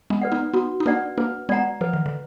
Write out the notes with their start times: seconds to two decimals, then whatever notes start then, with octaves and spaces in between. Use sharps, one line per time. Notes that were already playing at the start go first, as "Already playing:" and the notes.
0.10 G#3 B3
0.22 B4 D5 F#5
0.32 B3 D#4
0.53 B3 D#4 F#4
0.80 D#4
0.86 A#3 D4 B4 D5 F#5
1.18 A#3 D4 B4
1.49 G#3 B3 D5 F#5 A#5
1.81 F3 B4
1.93 D#3
2.06 D3